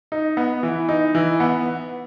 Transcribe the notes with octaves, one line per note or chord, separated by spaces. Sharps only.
D#4
B3
E3
D#4
E3
B3